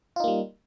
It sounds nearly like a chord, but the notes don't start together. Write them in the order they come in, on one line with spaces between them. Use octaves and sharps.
F4 D#4 A#3 G3